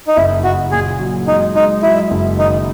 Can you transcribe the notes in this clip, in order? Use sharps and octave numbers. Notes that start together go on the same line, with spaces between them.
D#4
F#1 E4
F#1 F#4
A#2 G#4
F#3
G#3 D#4
G#3 D#4
F#3 E4
F#1
D#3 D#4